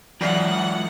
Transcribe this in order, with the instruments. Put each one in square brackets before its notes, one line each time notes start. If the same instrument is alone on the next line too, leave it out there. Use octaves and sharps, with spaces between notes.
[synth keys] E3 F#3 [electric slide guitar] G#3 F4 D5 [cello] F#5